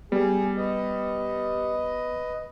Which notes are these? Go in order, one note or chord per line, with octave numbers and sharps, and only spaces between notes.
G3 B3 G#4
B4 D#5